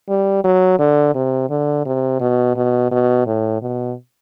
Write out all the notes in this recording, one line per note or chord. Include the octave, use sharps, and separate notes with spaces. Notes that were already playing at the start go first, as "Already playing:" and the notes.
G3
F#3
D3
C3
D3
C3
B2
B2
B2
A2
B2